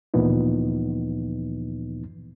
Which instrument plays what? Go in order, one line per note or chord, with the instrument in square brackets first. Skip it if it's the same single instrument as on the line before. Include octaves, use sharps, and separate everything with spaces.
[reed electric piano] D2 A#2 E3 F3 B3 D#4